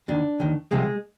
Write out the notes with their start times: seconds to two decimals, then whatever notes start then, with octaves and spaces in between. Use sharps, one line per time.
0.08 D#2 D#3 D4
0.40 D#2 D#3
0.71 C2 C3 F3 G#3